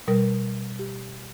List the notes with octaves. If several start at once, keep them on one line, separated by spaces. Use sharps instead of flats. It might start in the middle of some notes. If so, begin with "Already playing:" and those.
B2 G3 A#4
G4